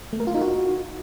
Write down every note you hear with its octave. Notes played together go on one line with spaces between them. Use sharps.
A3
A#4
F4
D#4
F#4